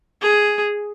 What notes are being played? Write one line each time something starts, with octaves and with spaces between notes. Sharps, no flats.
G#4